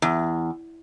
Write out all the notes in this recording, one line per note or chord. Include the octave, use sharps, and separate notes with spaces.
E2